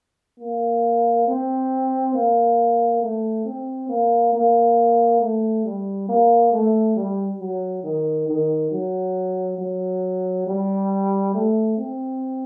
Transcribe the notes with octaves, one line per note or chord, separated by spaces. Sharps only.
A#3
C4
A#3
A3
C4
A#3
A#3
A3
G3
A#3
A3
G3
F#3
D#3
D#3
F#3
F#3
G3
A3
C4